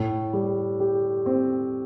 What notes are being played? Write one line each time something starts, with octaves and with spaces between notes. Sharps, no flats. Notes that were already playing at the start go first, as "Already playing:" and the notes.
Already playing: A2
G3
G4
C4